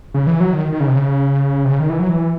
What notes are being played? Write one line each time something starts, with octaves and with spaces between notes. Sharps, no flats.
C#3
E3
F#3
D#3
D#3
C#3
C3
C#3
C3
C#3
D#3
E3
F#3
E3